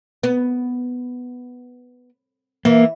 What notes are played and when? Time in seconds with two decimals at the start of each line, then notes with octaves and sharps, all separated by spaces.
0.23 B3
2.65 E3 A#3